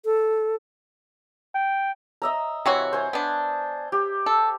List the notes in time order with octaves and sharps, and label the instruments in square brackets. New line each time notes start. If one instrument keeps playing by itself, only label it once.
[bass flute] A4
[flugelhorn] G5
[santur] D#5 E5 A#5
[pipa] C3 E3 F#4 [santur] C#5
[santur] C5 G#5
[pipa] B3 D4
[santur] G4
[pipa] A4